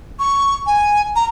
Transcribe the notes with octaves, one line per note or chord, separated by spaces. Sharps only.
C#6
G#5
A#5